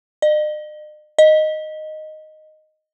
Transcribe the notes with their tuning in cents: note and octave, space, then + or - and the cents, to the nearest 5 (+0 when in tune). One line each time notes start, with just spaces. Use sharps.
D#5 -45
D#5 -5